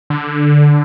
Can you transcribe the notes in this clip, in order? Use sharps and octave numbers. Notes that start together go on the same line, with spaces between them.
D3